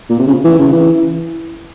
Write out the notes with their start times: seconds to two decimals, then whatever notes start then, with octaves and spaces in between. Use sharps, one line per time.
0.10 A#2
0.19 C3
0.27 C#3
0.44 E3
0.59 C#3
0.72 E3